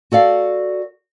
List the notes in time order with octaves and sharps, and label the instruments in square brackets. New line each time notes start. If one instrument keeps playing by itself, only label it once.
[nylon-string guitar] F#4 A4 D5 F5